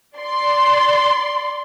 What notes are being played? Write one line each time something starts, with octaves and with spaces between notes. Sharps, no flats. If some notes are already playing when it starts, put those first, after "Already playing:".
D5 C6